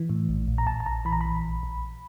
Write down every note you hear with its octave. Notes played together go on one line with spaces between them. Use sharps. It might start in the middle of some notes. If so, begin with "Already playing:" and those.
Already playing: E3
A2
A#1
A#1
A#5
A#1 A5
A5
A#1 A#5
E3 B5
A#5
A#1 B5
A#1
A#1